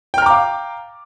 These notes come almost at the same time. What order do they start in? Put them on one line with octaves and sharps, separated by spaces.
G5 F6 A#5 D6 F5